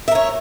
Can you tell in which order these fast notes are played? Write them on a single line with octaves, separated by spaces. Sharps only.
E5 A#4 C#5